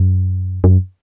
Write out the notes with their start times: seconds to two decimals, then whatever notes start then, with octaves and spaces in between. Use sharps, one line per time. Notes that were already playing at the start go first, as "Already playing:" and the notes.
Already playing: F#2
0.64 F#2